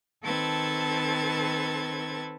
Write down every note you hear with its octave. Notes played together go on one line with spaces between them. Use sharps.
D#3 C4 A4 B4 A5 G#6